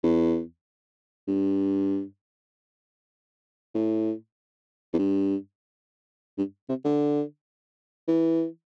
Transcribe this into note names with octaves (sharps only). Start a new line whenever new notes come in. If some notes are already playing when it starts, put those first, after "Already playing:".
E2
G2
A2
E2
G2
G2
C3
D3
E3